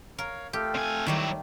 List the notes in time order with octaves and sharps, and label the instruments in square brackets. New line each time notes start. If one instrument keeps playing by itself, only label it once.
[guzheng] A#4 [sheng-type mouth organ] C#5 F5
[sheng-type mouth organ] A3 F4 A4 [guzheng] G4
[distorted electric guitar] C3 G#5
[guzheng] D#3 G3 A3 [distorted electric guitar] F#3 E4